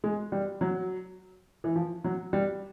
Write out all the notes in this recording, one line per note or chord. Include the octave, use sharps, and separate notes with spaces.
G#3
G3
F#3
E3
F3
F#3
G3